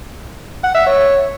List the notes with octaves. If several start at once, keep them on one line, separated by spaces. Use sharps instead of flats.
F#5
E5
C#5